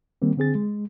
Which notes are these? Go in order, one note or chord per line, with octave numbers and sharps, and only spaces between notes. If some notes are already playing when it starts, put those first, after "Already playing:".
D#3 G3 A#3 C4
D3 C4 G#4 A6
G#3